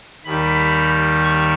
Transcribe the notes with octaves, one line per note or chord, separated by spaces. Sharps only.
D#2 D#3 G3 B5
C#6